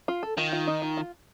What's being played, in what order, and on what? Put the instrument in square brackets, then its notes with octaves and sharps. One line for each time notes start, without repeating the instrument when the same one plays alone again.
[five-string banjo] F4
A4
[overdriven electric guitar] D#3 [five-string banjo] F4
[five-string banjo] F4
D#4
F4
F4